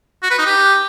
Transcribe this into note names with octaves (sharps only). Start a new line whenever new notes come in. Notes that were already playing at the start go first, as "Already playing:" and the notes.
F#4
B4
D#4
G4